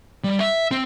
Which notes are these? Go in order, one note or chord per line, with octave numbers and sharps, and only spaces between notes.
G3
E5
C4